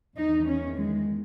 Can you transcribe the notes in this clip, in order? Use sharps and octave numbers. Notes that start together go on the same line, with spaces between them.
E2 D#3 D#4
C#4
G#3